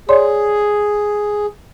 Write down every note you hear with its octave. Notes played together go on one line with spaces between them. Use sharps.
G#4 C#5 D5 C6